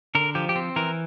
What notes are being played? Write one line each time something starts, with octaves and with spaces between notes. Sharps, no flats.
D3 A#4
F3 G4
G4
C4
E3 A#4